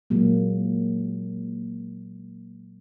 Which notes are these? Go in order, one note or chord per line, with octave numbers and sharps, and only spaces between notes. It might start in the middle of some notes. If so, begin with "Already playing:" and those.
A#2 F#3 G#3 A#3